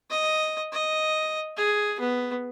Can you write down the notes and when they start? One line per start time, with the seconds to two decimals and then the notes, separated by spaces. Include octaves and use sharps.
0.11 D#5
0.72 D#5
1.57 G#4
2.00 B3